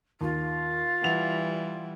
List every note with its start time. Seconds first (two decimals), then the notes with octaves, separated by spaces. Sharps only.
0.21 D#2 F4
1.03 E3 G3 F#5 F7